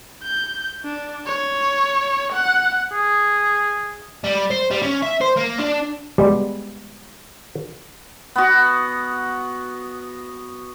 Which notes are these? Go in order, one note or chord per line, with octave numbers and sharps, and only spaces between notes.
G6
D4
C#5
F#5
G#4
G3
C5
G3
C#4
E5
C5
A#3
D4
G3 G#3 B3 G4
B3 F#4